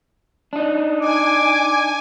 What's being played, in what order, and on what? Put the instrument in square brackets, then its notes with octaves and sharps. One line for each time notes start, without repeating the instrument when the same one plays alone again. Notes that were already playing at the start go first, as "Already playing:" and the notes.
[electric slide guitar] D4 D#4
[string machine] G#5 [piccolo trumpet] D6